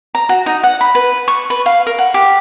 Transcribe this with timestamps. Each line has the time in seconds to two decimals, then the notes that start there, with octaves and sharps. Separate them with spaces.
0.15 A#5
0.29 F#4
0.46 D#4
0.63 F#5
0.81 B5
0.95 B4
1.28 C#6
1.50 B4
1.66 F5
1.87 A#4
1.99 F#5
2.14 G4